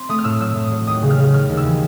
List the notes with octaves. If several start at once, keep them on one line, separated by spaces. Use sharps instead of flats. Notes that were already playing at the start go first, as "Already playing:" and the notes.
Already playing: C4 C6
A3 D#6
F6
A2 E6
F#3 E6
A2
D#6
F#3
D#2 D#6
C#3
F6
C#3
D#2 F6
D#2
E6
E3